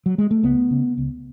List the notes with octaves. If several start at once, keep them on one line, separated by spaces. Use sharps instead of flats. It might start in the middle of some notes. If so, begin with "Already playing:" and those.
F#3
G#3
A3
C#2 B3
C#3
C#2